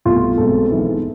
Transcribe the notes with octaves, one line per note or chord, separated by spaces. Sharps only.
C2 B2 A3 F4
B1 B2 G#3 C4 A4
G#1 G#2 E3 B3